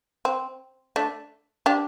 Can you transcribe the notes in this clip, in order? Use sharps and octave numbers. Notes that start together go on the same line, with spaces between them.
C4
A3 D4
D4 G4